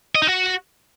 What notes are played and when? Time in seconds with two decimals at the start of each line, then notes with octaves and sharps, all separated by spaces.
0.15 D#5
0.22 D#4
0.29 F#4